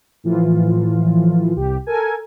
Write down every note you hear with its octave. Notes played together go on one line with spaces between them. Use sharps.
A2 E3 F3 F4
C2 G4
A4 A#4 G#5